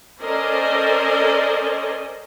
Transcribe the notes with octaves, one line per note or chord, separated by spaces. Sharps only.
C#4 A4 A#4 C5 D5 D#5